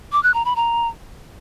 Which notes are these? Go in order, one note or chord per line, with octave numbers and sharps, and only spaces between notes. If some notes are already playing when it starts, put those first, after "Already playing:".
D6
F#6
A#5
B5
A#5